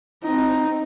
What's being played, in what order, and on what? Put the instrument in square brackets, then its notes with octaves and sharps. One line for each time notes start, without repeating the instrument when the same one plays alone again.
[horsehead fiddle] C4 D#4